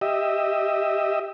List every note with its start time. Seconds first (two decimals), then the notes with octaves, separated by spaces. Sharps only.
0.01 G4 D#5 E5